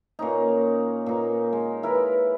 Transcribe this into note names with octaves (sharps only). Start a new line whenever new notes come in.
A#2 C#4 D#4
A#2 D#4
G#3
E4 A#4 B4